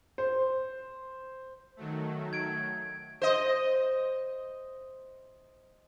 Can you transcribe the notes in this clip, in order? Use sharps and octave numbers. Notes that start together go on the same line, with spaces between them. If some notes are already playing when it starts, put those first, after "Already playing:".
C5
D#3 F#3 A3
G#6 D7
C5 D#5